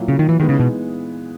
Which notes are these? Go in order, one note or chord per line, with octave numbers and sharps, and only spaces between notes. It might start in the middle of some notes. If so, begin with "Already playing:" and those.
Already playing: A#2 F#3 A#3 E4
C#3
D#3
E3
D#3 E3 G#3 B3 D#4
C#3
B2